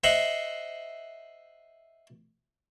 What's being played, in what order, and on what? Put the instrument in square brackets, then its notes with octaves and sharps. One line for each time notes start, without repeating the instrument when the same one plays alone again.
[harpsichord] C5 D#5 E5 F#5